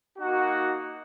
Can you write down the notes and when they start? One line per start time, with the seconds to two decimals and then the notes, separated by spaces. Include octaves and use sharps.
0.19 A#3 D#4 F#4